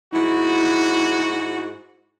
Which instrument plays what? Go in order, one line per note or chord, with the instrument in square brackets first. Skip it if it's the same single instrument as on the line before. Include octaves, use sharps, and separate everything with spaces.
[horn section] G#2 F#4 [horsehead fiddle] E4